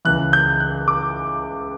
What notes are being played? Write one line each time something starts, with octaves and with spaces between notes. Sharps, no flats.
C#2 C#3 E3 F#6
G6
F#6
D6